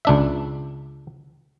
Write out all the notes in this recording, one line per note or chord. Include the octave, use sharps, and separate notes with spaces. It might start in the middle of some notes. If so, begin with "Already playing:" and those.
C#2 D4 E5